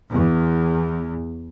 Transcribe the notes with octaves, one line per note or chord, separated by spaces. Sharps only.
E2